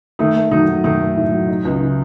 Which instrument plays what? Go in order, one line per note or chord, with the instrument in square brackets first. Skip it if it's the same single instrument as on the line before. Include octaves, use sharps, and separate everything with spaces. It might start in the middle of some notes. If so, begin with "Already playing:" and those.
[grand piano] D#3 D#4 [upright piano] A3
[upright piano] A3
[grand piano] D#3 D#4 [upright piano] F#3
[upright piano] F#3
[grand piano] D#3 D#4 [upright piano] A3
[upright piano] A3
A2
F#3
D#4
C#2
C#3